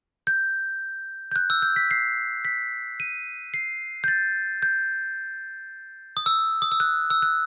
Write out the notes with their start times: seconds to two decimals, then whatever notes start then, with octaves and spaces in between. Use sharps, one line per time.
0.27 G6
1.31 G6
1.36 F#6
1.50 E6
1.62 G6
1.76 B6
1.91 C7
2.45 B6
3.00 D#7
3.54 C7
4.04 G6
4.08 A6
4.63 G6
6.17 D#6
6.26 E6
6.62 D#6
6.72 E6
6.80 F#6
7.10 E6
7.22 F#6